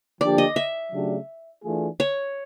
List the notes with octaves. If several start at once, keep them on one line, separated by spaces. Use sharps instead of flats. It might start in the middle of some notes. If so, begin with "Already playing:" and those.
D3 F3 A#3 D4 G4 D5
D#5
E5
C#3 F#3 A3 D4 G4
E3 A3 D4 F4 G#4
C#5